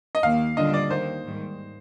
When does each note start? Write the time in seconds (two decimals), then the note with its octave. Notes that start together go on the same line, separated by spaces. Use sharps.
0.15 D#5
0.23 D#2 D#3 A#3 F5
0.57 D3 G3 D4 F4 D#5
0.74 D5
0.90 D#2 D#3 A#3 D#4 C5
1.24 G#2 D#3 G3